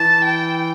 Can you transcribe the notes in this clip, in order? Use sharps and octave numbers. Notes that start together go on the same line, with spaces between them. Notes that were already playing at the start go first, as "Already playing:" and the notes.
Already playing: E3 A5
G5